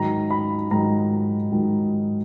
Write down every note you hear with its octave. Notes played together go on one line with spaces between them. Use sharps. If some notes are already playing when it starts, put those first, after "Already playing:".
Already playing: G#2 D#3 F#3 A#5
B5
G#2 D#3 F#3 A#5
G#2 D#3 F#3